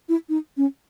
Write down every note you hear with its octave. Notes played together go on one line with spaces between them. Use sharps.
E4
D#4
C#4